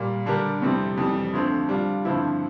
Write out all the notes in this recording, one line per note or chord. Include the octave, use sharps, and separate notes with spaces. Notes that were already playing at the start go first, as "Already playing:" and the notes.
Already playing: A#2 G3 A#3
D3 G3 D4 G4 A#4
F2 C3 G3 C4 E4
F2 E3 G3
D2 D3 F3 C4
G3 D4 F4
G2 D3 F3 C4 E4